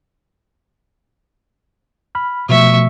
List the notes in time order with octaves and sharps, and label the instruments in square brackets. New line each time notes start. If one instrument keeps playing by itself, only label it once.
[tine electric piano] B5 F6
[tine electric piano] B2 F3 A3 [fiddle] E5 C#6